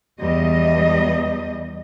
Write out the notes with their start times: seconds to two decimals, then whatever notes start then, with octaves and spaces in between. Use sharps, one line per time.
0.20 E2 G3 D#5